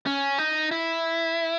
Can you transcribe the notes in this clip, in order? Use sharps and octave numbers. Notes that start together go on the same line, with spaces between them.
C#4
D#4
E4